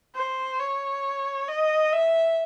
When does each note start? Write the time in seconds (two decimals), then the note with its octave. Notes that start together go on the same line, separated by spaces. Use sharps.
0.15 C5
0.60 C#5
1.48 D#5
1.92 E5